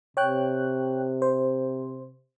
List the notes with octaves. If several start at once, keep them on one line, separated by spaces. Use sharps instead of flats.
C3 C#5 G5 F#6
C5